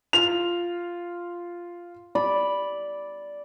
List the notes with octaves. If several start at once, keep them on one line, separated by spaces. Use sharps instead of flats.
F4 F7
D5 B5